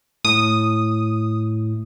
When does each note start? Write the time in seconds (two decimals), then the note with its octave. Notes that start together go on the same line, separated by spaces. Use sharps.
0.25 A2 D#6